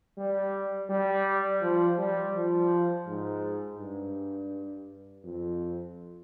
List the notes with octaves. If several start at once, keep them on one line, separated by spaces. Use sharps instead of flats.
G3
G3
F3
G3
F3
G#2
G2
F2